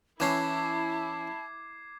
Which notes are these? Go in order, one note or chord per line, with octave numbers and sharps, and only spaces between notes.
E3 C#4 E4 A5 D6 G#6 C7